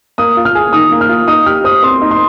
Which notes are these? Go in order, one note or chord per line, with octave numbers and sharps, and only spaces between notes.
A#3 D#6
F4
F6
G#4
D#3 D#6
A#3
F6
F4
D#4 D#6
G4 F6
C5 D#6
C4 C6
D#4
C6